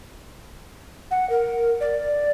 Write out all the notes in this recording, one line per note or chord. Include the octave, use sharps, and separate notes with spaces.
F#5
A#4
D5